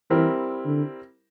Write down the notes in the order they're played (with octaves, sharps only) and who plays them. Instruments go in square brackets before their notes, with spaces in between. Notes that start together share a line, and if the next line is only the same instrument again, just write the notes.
[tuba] E3 [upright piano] G3 C4 E4 A#4
[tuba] D3